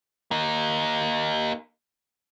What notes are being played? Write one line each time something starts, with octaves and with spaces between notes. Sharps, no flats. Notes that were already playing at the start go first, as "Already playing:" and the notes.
A#3 D#4